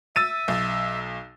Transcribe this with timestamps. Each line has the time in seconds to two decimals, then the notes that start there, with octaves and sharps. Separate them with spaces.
0.16 E5 E6 A6 D#7
0.48 B1